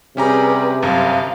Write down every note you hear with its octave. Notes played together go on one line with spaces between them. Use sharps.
C3 G3 C#4 G4 G#4 B4 A#5
G1 F#2 A3 F5 A#5